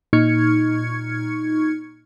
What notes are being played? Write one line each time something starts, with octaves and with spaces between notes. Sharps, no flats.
A#2 D#4 C#6 F6 G#6 C#7